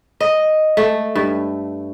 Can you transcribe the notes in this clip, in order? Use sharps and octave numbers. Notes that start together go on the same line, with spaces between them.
D#5
A3
G2